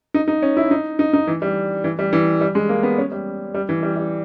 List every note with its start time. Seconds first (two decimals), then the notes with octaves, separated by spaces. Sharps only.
0.14 D#4
0.28 D#4
0.42 C#4
0.57 E4
0.71 D#4
0.99 D#4
1.13 D#4
1.27 E3
1.42 G3
1.84 E3
1.99 G3
2.13 E3
2.41 G3
2.55 G#3
2.69 A#3
2.83 B3
2.98 C#4
3.12 G3
3.54 G3
3.69 E3
3.83 G3
3.96 G3